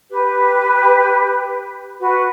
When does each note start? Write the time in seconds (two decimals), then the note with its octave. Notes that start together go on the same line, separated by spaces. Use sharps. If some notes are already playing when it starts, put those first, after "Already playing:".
0.09 G4 B4
1.99 F#4 B4